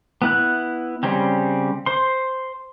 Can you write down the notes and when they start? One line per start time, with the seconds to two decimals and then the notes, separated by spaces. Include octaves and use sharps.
0.22 B3 E4 F#6
1.03 C#3 G3 C4 C#4
1.86 C5 C6